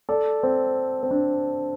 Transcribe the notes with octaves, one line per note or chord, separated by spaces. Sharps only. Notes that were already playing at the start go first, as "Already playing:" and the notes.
A4 D5
C4
C4
D4